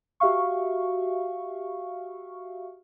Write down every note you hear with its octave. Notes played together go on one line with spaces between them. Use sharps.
F#4 G4 E5 F5 C#6